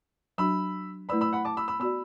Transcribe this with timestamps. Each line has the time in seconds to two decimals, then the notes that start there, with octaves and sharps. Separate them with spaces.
0.38 F#3 D4 F#4 B5 E6
1.09 A3 E4 B4 D5 B5 E6
1.21 B5 E6
1.33 F#5 B5
1.45 A5 D6
1.57 B5 E6
1.68 B5 E6
1.80 B3 F#4 D5 B5 E6